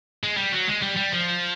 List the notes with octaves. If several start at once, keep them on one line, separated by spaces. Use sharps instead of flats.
G#3
G3
F#3
G#3
G3
G3
F3